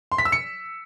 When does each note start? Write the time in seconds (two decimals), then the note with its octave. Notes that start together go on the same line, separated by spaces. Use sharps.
0.12 C6
0.18 B6
0.25 E6
0.32 C#7